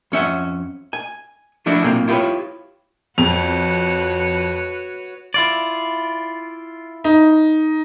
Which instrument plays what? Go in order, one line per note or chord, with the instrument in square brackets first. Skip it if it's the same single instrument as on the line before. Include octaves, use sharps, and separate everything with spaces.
[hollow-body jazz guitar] F2 C#4 E5 F#5
G#5
F3 A3 D4 E4 F#4
B1 A#2 A#3 C4 F5
E4 F4 G4 G#4 B4 C#5
[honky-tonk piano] F2 F7 [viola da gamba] F#4 B4 C#5
[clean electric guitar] E4 F4 D5
[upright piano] D#4